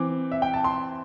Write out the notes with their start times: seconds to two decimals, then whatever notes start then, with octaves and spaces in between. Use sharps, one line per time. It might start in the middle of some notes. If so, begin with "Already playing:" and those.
Already playing: E3 C4 D6
0.31 E5
0.42 G5
0.54 A5
0.64 C6